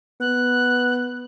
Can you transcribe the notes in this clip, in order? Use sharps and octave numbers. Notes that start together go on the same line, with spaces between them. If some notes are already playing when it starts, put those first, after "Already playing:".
B3 F#6